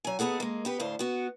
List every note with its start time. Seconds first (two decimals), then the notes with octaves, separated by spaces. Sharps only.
0.05 F#3 G#5
0.19 D#2 B3 G#4 A4 F#5
0.40 G#3 A#3
0.65 B3 G4 B4
0.79 D2 A2 C5 F5
0.99 B3 F#4